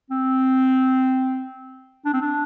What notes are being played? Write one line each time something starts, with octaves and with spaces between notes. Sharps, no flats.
C4
D4
C4
D4